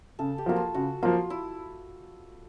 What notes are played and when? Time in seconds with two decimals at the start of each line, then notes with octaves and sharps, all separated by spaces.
0.19 C#3 A4
0.38 G4
0.46 F3 A#3 F#4
0.56 F4
0.74 C#3 F#4
1.03 F3 A#3 F4
1.30 E4